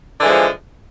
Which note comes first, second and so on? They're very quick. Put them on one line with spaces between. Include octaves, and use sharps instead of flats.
D3 E3 G#3 F3